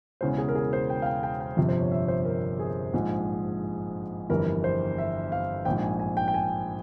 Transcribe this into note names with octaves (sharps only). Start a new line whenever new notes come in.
E1 E2 C#3 E3 C5
G#4
A#4
G#4
C5
G5
F5
G5
G5
G5
G1 F2 C3 F3
C5
C#5
E5
C5
A#4
G#4
A#1 G#2 F3 G#3
G1 F2 E3 G3 A#4
C5
E5
F5
A#1 G#2 F3 G5
G#5
G#5
G5
G5
G#5